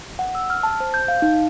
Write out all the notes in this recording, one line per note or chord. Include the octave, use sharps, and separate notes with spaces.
F#5
E6
F6
A5
C5
G6
F5
D#4